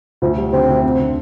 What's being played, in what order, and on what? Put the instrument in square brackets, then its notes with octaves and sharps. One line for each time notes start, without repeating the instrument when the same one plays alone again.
[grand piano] D2 [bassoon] F3
[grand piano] G3
[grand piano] D3 [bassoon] C4
[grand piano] D2
F2
D3